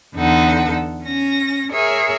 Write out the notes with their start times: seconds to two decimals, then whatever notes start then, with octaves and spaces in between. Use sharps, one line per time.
0.15 E2 D3 D#4 A4 F#5
1.05 C#4 A#6
1.71 G#4 A#4 C#5 E5